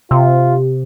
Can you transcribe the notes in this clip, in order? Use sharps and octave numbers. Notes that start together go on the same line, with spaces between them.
C3 F4